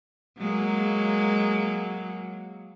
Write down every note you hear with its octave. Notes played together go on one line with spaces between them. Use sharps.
F#3 G#3 A#3